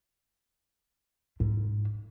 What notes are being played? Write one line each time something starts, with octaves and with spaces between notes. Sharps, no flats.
G#2